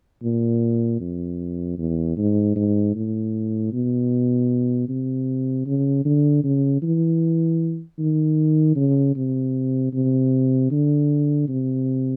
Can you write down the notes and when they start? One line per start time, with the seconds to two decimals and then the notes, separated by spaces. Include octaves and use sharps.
0.23 A#2
1.00 F2
1.78 E2
2.17 G#2
2.56 G#2
2.95 A2
3.73 B2
4.89 C3
5.66 C#3
6.05 D3
6.44 C#3
6.82 E3
7.99 D#3
8.76 C#3
9.16 C3
9.93 C3
10.71 D3
11.48 C3